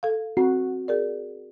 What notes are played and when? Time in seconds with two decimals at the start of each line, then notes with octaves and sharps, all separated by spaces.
0.03 A4 F5
0.37 C4 F#4
0.88 G#4 A#4 D5